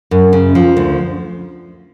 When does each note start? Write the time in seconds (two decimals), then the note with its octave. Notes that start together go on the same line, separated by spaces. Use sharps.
0.11 F#2
0.33 C#3
0.55 F3
0.77 D2